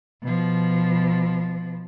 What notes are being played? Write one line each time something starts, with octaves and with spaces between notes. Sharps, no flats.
B2 F3